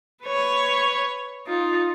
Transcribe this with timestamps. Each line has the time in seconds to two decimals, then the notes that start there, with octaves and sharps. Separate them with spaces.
0.24 B4 C#5
1.47 D#4 F4